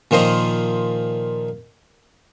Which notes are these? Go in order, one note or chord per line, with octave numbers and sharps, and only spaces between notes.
A#2 D#3 F3 C5 D#5